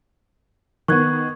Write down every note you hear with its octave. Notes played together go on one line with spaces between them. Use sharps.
D#3 B3 C#6 F#6 G#6